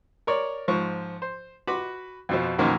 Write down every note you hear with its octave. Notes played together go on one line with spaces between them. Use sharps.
A#4 C#5 D5
G#2 F3 C#6
C5
F#4 B4 B5 D6
F2 B2 F3
B1 F#2 D#3 F3 F#3 A#3